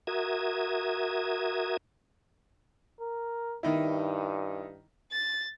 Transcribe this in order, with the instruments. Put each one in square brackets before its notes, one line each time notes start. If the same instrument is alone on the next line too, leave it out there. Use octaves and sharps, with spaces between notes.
[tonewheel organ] F#4 A#4 E5 D#6 G#6
[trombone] A#4
[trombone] G2 [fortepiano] D#3 D#4 E4
[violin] A6